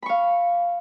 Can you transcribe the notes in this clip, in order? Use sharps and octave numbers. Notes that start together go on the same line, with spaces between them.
F5 B5 C#6